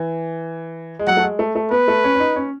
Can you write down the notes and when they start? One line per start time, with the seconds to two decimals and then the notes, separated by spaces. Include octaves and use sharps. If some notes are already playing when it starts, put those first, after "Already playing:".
Already playing: E3
0.99 G#3
1.07 F#3 F#5
1.17 A3
1.23 G#3
1.39 A3
1.55 A3
1.71 B3 B4
1.88 A3
2.04 C#4
2.15 C#4
2.20 D#4
2.36 C#4